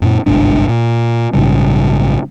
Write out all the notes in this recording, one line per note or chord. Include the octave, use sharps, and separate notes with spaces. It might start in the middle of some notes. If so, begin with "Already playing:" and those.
F#2 A#2
G1 C2 G#2 D4
A#2
A#1 G#2 C#3 G3